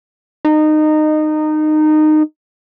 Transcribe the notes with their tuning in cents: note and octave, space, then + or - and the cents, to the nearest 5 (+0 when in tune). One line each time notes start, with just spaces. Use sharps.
D#4 -20